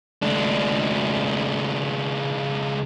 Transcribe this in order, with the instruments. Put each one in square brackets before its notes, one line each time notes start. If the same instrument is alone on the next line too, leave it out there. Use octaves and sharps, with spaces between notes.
[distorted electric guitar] C#2 D4